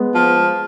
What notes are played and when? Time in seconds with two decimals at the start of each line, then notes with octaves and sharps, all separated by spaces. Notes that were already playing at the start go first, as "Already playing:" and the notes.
Already playing: G#3 B3
0.15 F3